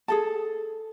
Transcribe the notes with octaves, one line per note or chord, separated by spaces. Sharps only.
G#4 A4 A5